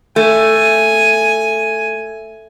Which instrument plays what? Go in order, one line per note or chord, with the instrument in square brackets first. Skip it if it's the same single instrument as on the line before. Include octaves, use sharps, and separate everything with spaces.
[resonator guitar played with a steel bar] A3 [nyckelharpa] G#5